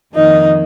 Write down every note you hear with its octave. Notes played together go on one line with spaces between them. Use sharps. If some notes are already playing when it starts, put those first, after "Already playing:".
F2 D#3 A#3 D#4 D#5